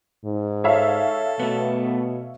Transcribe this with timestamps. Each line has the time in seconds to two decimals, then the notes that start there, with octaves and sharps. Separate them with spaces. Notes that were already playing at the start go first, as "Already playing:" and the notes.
0.25 G#2
0.64 A4 C#5 E5 F5
1.40 B2 A3 B3